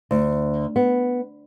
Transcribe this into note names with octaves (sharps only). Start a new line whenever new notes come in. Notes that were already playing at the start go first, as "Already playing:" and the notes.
D2
B3